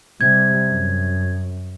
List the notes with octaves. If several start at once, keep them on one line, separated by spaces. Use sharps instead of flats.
C3 G3 G#6
F#2